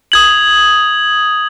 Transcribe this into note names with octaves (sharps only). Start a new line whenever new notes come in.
D#6 G#6 F#7